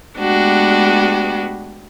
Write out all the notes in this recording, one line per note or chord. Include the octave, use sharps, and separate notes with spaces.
G#3 A3 B3 D4 F#4 G4